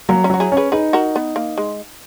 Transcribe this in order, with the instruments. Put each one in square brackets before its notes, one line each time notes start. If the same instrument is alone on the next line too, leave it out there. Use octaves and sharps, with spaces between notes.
[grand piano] F#3 [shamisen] A#3 C#4
[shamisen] C#4 E4
[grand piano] F#3 [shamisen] F#4
[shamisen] E4 G#4
[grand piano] C#4
[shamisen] G#4 B4
[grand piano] D#4 [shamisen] G#4 B4
[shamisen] F#4 A#4
B3
A#3
G#3